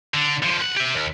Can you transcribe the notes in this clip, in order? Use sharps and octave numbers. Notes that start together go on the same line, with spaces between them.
D3
D3 F3
B1 F#5
G4 E5
D#2